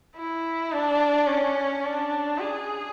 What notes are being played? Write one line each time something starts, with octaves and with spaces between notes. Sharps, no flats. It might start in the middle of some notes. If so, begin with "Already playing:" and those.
E4
D4
C#4
D4
G#4